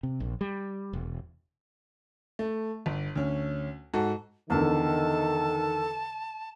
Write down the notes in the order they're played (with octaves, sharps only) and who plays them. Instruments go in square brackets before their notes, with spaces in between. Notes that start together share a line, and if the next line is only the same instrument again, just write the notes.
[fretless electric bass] C3
A#1
G3
E1
[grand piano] A3
G1
D2 C#4
G#2 F#4 A4
[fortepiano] E2 D3 [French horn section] D#3 [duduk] A4 [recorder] A5